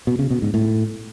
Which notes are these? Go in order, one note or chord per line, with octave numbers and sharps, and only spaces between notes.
B2
C#3
B2
G#2
A2